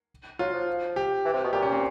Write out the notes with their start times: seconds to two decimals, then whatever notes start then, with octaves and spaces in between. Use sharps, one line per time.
0.39 F#3 F4
0.54 F3
0.96 G4
1.25 E3
1.33 C3
1.44 B2
1.53 A#2 G4
1.62 C#4
1.72 C4